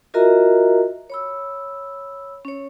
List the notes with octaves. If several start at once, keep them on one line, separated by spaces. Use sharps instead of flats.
F4 F#4 A#4 D#5 E5 A#5
C#5 B5 E6
C#4 C#5